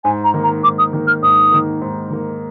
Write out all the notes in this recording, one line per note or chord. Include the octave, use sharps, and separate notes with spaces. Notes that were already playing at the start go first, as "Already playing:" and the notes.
G#2 G#5
A#5
D#3 A#3
A#5
G#2 D6
D#6
D#3 A#3
F6
G#2 D#6
D#3 A#3
G#2
D#3 A#3